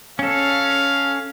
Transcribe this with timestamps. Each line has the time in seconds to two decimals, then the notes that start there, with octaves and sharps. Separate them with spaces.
0.19 C#4 A4 F5